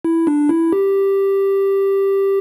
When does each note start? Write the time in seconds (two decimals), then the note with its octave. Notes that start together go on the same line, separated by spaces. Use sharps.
0.05 E4
0.27 D4
0.49 E4
0.73 G4